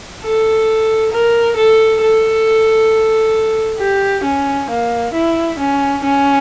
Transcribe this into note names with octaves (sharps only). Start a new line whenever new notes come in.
A4
A#4
A4
A4
G4
C#4
A#3
E4
C#4
C#4